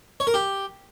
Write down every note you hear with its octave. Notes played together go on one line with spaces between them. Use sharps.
C#5
A#4
G4